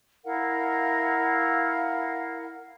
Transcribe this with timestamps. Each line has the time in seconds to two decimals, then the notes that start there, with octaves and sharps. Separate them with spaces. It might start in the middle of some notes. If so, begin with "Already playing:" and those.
0.24 E4 A#4 F5 F#5